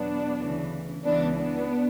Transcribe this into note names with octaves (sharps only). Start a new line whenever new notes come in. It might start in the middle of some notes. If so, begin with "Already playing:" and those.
Already playing: E2 B2 F#3 B3 D4
D2 C#3 E3
C#2 C#3 E3 B3 D4
B3 D4